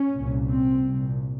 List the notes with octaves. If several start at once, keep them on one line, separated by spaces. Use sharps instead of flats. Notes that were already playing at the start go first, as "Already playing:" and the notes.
Already playing: C#4
A#2
C2
C4
C2 A#2